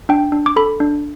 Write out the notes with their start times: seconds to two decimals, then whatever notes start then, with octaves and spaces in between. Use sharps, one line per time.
0.09 D4 G5
0.32 D4
0.46 D6
0.56 A4 B5
0.80 D4